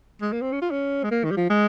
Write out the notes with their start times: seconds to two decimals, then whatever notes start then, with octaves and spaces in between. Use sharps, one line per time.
0.22 G#3
0.32 A#3
0.42 C4
0.52 C#4
0.62 F4
0.71 C#4
1.04 G#3
1.11 A#3
1.24 D#3
1.31 G3
1.37 F3
1.50 G#3